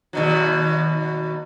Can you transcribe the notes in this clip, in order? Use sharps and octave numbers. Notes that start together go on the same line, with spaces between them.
D#2 B2 F#3